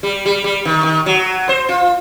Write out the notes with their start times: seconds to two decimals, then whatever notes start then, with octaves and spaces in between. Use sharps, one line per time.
0.03 G3
0.26 G3
0.44 G3
0.65 D#3
0.83 D#3
1.06 F#3
1.49 C5
1.69 F4